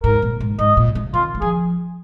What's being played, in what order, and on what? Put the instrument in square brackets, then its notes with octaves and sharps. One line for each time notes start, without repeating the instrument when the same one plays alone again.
[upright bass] G#2 [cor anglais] A#4
[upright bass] A#2
G#2
[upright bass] G#2 [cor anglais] D#5
[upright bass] A#2
C3
[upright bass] D#3 [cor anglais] F4
[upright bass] G#3
[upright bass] F3 [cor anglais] G#4